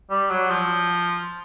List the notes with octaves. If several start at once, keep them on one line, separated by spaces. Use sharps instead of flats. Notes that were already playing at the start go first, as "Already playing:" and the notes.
G3
F#3
F3